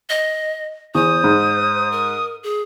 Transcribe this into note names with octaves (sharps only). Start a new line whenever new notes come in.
D#5
E2 C5 D#6
G#2
A#4
G#4